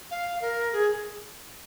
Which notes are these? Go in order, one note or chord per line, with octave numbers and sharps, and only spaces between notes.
F5
A#4
G#4